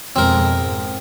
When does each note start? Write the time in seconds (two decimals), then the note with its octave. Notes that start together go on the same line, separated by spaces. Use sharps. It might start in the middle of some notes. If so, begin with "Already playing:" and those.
0.16 F2 B2 G#3 C4 A#4
0.54 G#2